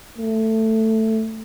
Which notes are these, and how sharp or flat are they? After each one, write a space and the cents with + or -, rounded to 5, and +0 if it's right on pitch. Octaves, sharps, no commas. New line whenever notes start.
A3 +10